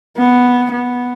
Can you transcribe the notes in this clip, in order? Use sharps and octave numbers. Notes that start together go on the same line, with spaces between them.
B3
B3